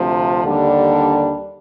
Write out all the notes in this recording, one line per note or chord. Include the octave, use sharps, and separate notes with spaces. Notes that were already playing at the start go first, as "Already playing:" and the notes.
Already playing: D2 C3 F3
D#2 D3 G3 D4